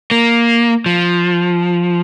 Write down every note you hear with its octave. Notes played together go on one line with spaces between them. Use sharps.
A#3
F3